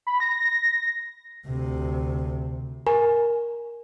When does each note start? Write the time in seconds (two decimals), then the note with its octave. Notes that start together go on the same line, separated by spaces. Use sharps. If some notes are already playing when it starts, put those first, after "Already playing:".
0.07 B5
0.20 A#6
1.47 D2 C3
2.87 A#4 G#5